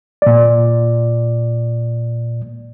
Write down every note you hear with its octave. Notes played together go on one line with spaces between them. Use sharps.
A#2 D5